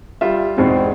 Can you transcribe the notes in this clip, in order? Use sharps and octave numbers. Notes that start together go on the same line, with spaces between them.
G3 F4 E5
E2 G#2 B2 C4